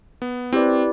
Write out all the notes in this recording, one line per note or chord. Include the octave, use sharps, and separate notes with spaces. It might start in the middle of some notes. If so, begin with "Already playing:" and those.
B3
C4 E4 G4 B4 D5